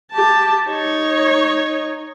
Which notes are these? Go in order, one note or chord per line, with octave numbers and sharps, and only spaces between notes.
G4 A5
D#4 C#5